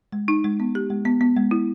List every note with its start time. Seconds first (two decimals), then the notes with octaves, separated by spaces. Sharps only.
0.12 G#3
0.28 D#4
0.44 G#3
0.60 B3
0.75 G4
0.90 G#3
1.05 B3
1.21 B3
1.36 G#3
1.51 E4